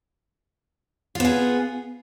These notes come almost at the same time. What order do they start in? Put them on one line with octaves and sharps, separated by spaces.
F4 B3 G#4